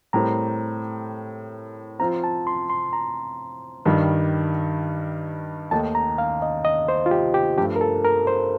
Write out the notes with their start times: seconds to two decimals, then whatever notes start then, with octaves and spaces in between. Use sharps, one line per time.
0.13 A2 G3 C4 G4 A#4 A#5
1.99 F3 C4 F4 A#5
2.24 A5
2.47 C6
2.70 C6
2.93 A#5
3.85 G2 D#3 G3
5.71 D#2 D#3 A3 D#4 A4 A5
5.95 A#5
6.18 F5
6.42 D#5
6.65 D#5
6.88 C5
7.06 F4
7.11 G4
7.34 G4
7.58 G2 F3 A3 G4
7.76 A#4
7.81 A4
8.05 A#4
8.27 C5